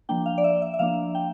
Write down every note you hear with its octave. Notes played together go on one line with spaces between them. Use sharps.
F3 A#3 D4 G5
F5
D5
E5
E5
E5
F3 A#3 D4 F5
G5